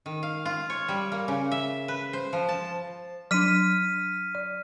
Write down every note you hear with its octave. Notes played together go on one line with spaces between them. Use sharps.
D#3
F5
F4
C#5
G3
A#3
C#3
E5
B4
C5
F3
A5
F#3 D4 F6 B6 D#7
D5